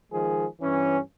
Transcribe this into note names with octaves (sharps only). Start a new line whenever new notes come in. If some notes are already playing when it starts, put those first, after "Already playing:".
D#3 F3 G#3 G#4
G2 E3 C#4